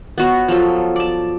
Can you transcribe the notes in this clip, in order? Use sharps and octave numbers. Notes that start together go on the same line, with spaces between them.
B3 F#4 C#5
F3 F#3 A4
D5 A5